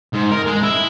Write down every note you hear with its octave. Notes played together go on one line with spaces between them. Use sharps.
G#2
A#4
G#3
E4